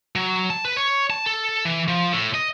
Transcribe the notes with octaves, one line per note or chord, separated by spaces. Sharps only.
F#3
A5
B4
C#5
A5
A4
E3
F3
A2
D#5